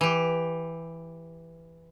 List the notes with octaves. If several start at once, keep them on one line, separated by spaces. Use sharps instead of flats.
E3 G4